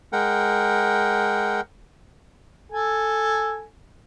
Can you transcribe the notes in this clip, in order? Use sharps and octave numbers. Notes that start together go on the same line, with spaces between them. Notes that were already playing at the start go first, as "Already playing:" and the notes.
G#3 A#4 F#5 G5
A4 G#5